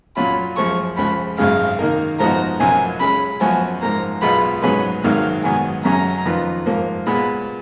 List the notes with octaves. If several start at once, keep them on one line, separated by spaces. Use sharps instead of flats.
A#2 F#3 C#4 F4 B5
F#2 F3 G#3 C#6
C#2 C#3 F3 B5
G#1 F#2 C#3 G#3 F5
D#3 A#3 D#4 A#4
G#2 F3 B3 D#4 F#4 A#5
A#1 A#2 F#3 A#3 C#4 G#5
C#3 G#3 C#4 B5
F#2 F3 B3 F#4 G#5
G#2 F3 A#3 A#5
B1 B2 G#3 B3 F4 B5
G#2 F#3 C#4 G#4 B4 B5
G#1 G#2 D#3 F#3 A#3 F5
G#2 D#3 F#3 B3 G#5
F#2 C#3 F#3 C#4 G#4 A#5
F2 D#3 A#3 F4 B4
G#2 F3 A#3
A#2 G#3 B3 B5